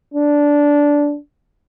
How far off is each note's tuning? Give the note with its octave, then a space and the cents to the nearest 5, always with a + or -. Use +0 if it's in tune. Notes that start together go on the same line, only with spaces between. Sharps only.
D4 -10